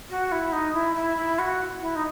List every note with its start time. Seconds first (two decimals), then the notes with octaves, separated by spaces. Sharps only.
0.10 F#4
0.32 E4
0.52 D#4
0.74 E4
0.96 E4
1.17 E4
1.39 F#4
1.82 E4
1.96 D#4